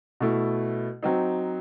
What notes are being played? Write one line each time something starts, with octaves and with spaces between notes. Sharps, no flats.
B2 A3 E4
F#3 C4 D#4